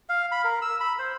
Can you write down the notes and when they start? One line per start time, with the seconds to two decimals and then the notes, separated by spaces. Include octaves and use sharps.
0.09 F5
0.32 B5
0.44 A#4
0.62 E6
0.80 B5
0.99 C5